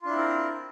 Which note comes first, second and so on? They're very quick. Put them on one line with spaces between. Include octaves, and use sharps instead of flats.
F4 D4 E4 C4 A#4